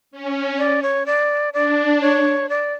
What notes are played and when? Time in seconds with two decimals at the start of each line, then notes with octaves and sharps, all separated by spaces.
0.11 C#4
0.58 D5
0.83 C#5
1.06 D5
1.54 D4 D5
2.01 C#5
2.49 D5